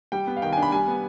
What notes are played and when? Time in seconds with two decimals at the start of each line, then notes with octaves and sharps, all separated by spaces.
0.12 G3 G5
0.27 B3
0.37 F5
0.42 D#3 G5
0.53 D4 G#5
0.62 B5
0.72 G3 G#5
0.88 B3